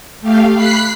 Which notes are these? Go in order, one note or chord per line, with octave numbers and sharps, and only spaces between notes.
A3 G4 F5
B5 F#6 B6 C7